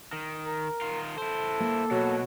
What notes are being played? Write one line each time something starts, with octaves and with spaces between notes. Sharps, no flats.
D#3
A#4
D#3 F4
E4 A4 C5
A#3
B2 F#3